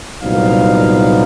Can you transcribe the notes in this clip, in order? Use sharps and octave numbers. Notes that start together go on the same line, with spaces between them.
C2 A#2 F#3 B3 D#4 F5